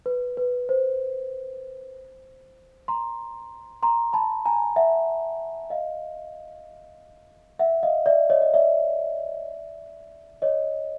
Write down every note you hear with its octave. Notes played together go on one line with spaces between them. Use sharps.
B4
B4
C5
A#5 C6
A#5 C6
A5 B5
G#5 A#5
E5 F#5
D#5 F5
E5 F#5
D#5 F5
D5 E5
C#5 D#5
D#5
D5 E5
C#5 D#5